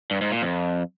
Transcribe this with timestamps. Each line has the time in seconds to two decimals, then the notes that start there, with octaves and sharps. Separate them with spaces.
0.11 G2
0.21 G#2
0.32 A#2
0.42 F2